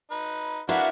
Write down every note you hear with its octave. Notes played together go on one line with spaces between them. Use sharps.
D#4 B4
D4 E4 F#4 A#4 B4 F5 F#5